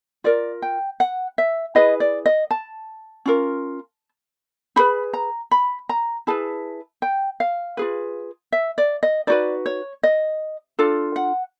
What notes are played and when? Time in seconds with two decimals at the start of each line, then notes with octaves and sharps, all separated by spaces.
0.24 F4 A#4 D5
0.62 G5
1.00 F#5
1.38 E5
1.75 E4 G#4 B4 D#5
2.00 D5
2.26 D#5
2.51 A5
3.25 C#4 F4 A#4
4.76 D#4 G#4 B4 B5
5.13 A#5
5.51 B5
5.89 A#5
6.27 E4 G#4 B4 A5
7.02 G5
7.40 F5
7.77 F4 G#4 B4
8.52 E5
8.78 D5
9.03 D#5
9.27 D#4 F#4 B4 D5
9.66 C#5
10.03 D#5
10.79 D4 F4 A4
11.16 F#5